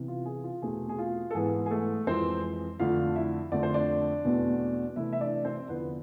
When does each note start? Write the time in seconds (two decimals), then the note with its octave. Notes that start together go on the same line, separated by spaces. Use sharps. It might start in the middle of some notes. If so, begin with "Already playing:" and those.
Already playing: C3 E3 B3
0.08 F4
0.25 G#4
0.44 F4
0.62 E2 B2 A3 C4 G#4
0.89 G#4
0.98 F4
1.31 A4
1.35 G#2 E3 B3 G#4
1.66 G#4
1.71 A3 A4
2.07 F2 E3 G#3 C4 C5
2.79 F2 D3 A3 F4 F5
3.16 E4 E5
3.52 F2 D3 A3 C4 D5
3.63 C5
3.74 D4 D5
4.24 E2 B2 A3 C4
4.96 C3 E3 A3 C4 E4 E5
5.13 E5
5.21 D4 D5
5.45 C4 C5
5.69 E2 D3 F3 B3 B4